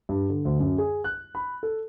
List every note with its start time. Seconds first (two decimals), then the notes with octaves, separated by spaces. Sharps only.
0.09 G2
0.30 D3
0.45 D2
0.60 F#2
0.78 G#4
1.04 F#6
1.35 B5
1.63 A4